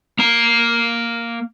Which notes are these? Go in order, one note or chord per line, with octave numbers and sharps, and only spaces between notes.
A#3 A#5